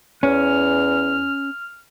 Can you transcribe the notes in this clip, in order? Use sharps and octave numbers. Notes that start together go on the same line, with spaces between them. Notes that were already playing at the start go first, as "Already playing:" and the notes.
E2 C#4 F6